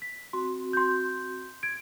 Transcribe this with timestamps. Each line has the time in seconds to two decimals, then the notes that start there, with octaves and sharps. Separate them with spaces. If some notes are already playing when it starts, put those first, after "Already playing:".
0.02 B6
0.33 C4 F#4 C6
0.73 C6 G6
1.63 G#6 D7